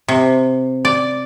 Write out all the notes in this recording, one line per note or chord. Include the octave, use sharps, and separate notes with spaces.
C3
D5